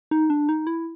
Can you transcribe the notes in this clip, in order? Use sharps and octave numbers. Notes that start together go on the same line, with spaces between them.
D#4
D4
D#4
E4